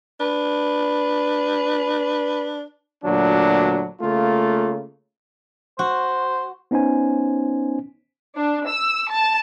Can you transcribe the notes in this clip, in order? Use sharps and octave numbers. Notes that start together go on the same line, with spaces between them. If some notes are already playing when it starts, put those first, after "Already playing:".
D4 B4
D2 A#2 F#3 D4
C#3 A3 A#3 F4
F#4 C5
B3 C#4 D#4 C5 G#5
D4
E6
A5